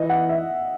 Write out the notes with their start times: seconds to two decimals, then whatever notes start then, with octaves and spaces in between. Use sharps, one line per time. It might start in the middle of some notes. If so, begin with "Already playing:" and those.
Already playing: E3 D#5
0.10 F#5
0.29 E5